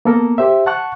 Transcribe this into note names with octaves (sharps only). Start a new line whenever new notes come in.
A#3 B3 A4 A#4
G4 C5 E5
F#5 A5 C#6 F#6